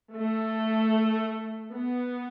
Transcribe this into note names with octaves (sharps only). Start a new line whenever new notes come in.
A3
B3